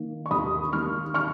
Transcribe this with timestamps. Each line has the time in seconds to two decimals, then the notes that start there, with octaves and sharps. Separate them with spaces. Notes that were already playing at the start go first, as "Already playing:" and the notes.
Already playing: D#3 A#3
0.26 C#6
0.31 D#2 B5 D#6
0.73 D#3 A#3 C#6 F6
1.14 C#6 F6